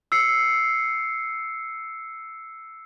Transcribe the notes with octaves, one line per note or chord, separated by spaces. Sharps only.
E6 C7 C#7